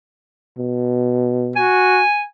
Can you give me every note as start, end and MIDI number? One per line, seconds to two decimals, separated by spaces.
0.58 1.68 47
1.56 2.03 66
1.56 2.21 80